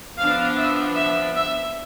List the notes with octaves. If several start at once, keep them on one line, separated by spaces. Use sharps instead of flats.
F3 B3 D4 F5
E5
E5
E5